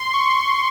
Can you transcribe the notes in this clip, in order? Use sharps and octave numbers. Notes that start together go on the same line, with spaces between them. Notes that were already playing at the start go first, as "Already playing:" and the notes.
Already playing: C6
C#6